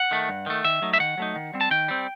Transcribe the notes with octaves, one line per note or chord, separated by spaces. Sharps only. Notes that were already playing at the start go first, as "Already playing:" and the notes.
Already playing: F#5
D#3 A3
G2
D#3 A3
D#3 E5
F#3 A3 D#4
E5
D#3 F#5
F#3 A3 D#4
D#3
G3 C4
A5
D#3 G5
G3 C4